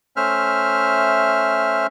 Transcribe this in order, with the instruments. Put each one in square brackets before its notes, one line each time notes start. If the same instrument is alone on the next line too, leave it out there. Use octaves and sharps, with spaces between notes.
[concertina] A3 C#4 C5 E5 F6